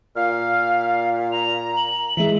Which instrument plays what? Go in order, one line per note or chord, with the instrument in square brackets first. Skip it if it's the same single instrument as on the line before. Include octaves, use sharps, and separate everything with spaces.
[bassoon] A#2 [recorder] F5 [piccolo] F6
[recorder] A#5 [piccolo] F7
[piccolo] F#7
[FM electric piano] E3 G#3 [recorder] E5